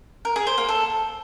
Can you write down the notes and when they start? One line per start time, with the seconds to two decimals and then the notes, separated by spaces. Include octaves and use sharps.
0.25 A#4
0.36 G#4
0.47 C5
0.58 A#3
0.69 A4